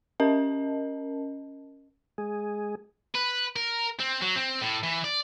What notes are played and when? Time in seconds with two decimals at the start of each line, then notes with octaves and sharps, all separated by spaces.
0.20 C#4 A#4 D#5 A5
2.18 G#3 G#4
3.15 B4
3.56 A#4
4.00 C4
4.22 F#3
4.36 C4
4.62 A2
4.83 E3
5.04 D5